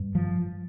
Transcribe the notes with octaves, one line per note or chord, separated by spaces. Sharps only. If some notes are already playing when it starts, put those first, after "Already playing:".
Already playing: G2
F3